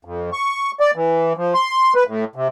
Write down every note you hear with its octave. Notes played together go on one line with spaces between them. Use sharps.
F2
C#6
D5
E3
F3
C6
B4
A2
C3